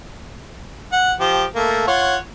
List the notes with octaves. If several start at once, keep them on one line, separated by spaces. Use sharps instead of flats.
F#5
F3 G4
A3 A#3
F4 C#5 F#5